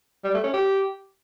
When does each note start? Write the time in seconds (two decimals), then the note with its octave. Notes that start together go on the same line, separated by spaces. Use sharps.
0.24 G3
0.34 A3
0.44 C#4
0.54 G4